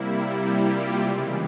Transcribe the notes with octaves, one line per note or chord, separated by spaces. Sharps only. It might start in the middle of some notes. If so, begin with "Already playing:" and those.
Already playing: C3 G3 A#3 E4
G3 G4
F4
C#3 E3 G#3